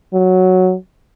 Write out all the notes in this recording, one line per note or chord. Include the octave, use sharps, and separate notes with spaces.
F#3